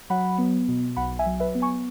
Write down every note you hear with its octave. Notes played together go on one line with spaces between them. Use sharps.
F#3 F#5 B5
B3
B2
B1 F#5 B5
E5 G#5
F#3
B4 E5
B3
G#5 C#6